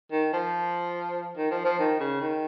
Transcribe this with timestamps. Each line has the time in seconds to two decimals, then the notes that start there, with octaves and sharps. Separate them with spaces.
0.12 D#3
0.33 F3
1.37 D#3
1.51 F3
1.65 F3
1.79 D#3
2.00 C#3
2.21 D#3